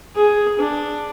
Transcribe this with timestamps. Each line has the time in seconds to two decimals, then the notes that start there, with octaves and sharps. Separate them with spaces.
0.15 G#4
0.59 D4